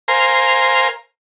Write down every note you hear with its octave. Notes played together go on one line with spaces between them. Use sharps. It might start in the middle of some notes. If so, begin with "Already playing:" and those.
A#4 C5 F5 G#5 A#5 C6